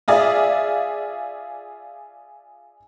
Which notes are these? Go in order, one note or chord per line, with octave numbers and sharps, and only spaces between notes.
F4 G#4 D5 E5